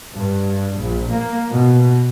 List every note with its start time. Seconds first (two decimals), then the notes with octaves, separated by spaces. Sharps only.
0.15 G2
0.81 A#1
1.13 A#3
1.49 B2